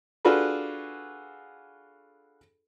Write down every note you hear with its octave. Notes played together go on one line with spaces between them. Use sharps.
D4 F4 F#4 G#4 A4 B4